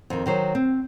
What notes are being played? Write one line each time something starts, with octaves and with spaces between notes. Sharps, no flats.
F2 D#3
D#3 F#3 C5
C4